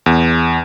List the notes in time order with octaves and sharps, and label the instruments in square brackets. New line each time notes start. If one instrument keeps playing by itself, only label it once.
[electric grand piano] E2